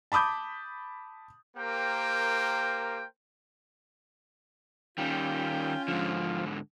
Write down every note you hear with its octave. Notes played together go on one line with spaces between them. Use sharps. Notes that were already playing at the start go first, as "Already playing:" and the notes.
A5 B5 D6 D#6 G6
A#3 G4 A#4 C5 G5
D#3 G3 C#4 F4 G5
G#2 D3 F3